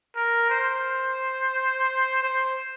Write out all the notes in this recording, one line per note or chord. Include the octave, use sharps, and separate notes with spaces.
A#4
C5
C5